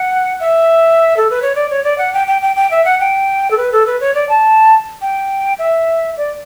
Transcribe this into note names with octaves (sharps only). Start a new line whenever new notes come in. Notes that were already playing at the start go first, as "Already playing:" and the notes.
Already playing: F#5
E5
A4
B4
C#5
D5
C#5
D5
F#5
G5
G5
G5
G5
E5
F#5
G5
A4
B4
A4
B4
C#5
D5
A5
G5
E5
D5